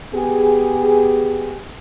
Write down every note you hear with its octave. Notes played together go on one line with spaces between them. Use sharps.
B3 G4 G#4